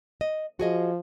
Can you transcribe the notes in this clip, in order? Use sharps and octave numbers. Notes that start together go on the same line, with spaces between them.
D#5
F3 F#4 G#4 D#5